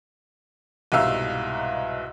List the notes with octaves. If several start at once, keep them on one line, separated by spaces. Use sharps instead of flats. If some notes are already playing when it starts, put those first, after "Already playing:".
C2 G#2 B2 E5 F5 E6